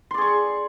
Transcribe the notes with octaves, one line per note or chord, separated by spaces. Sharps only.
G#4 D5 C6 C#6